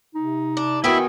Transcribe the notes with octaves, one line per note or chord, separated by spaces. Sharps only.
C3 D#4
D4
D#3 B3 E4 F#4 E5 G5 G#5